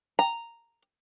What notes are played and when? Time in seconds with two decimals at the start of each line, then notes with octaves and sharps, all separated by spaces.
0.19 A#5